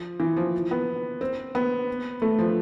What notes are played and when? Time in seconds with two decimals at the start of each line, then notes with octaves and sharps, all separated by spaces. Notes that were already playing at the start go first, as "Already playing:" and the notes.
Already playing: F3
0.20 E3
0.36 F3
0.71 B3
1.21 C4
1.55 B3
2.22 A3
2.38 F3